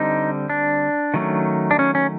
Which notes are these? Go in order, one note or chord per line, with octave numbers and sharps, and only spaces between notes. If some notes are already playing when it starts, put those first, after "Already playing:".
Already playing: D3 G3 C4 D#4
D4
D#3 F#3 A3 C#4
D4
C#4
C#4